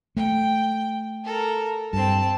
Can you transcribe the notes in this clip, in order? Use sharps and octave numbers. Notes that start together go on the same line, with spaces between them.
A3 G5
A4 A#4
G2 C4 A5